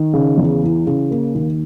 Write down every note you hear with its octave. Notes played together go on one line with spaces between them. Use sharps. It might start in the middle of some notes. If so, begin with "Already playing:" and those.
Already playing: D#3
C#3
E2
E3
C#3
A#3
D#2